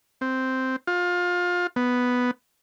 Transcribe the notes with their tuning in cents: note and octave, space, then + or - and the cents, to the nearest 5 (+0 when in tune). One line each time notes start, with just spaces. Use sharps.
C4 -5
F4 +25
B3 +0